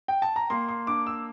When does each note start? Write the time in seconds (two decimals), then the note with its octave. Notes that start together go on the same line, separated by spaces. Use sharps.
0.08 G5
0.22 A5
0.36 A#5
0.50 A#3 C6
0.68 C6
0.87 D4 D6
1.07 E6